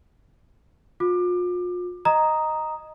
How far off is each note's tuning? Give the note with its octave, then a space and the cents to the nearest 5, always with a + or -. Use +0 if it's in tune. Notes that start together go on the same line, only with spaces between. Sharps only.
F4 +40 D6 +25
D#5 -5 A#5 +0 D#6 +0